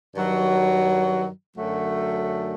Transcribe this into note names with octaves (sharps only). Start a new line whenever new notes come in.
G2 D#3 F#3
F#2 D3 F#3 A3